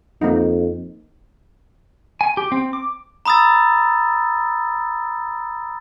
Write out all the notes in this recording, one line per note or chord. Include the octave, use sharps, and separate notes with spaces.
F2 A#3 D#4
G#5
G4
C4
D6
A#5 B5 D#6 E6 A6